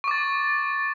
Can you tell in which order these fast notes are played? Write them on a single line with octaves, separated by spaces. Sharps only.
C#6 D6 A6